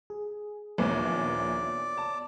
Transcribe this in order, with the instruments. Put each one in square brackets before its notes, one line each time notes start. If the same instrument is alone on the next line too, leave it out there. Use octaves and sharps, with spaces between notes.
[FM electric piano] G#4
[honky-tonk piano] A#1 D#2 E3 [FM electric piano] B3 C#5 [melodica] D5
[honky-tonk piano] A5